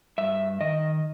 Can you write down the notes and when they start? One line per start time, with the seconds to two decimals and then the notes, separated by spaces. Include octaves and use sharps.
0.18 G2 E5
0.61 D#3 D#5